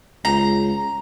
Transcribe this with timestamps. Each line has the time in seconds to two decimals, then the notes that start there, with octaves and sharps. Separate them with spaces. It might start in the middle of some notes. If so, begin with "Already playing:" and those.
0.25 C#2 A#5